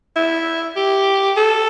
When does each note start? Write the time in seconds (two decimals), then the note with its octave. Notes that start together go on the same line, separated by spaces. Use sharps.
0.16 E4
0.76 G4
1.37 A4